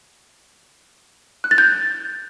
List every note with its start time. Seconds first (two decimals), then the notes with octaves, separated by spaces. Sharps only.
1.44 F#6
1.51 A6
1.58 G6